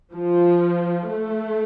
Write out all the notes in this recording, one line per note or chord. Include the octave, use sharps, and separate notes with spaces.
F3
A3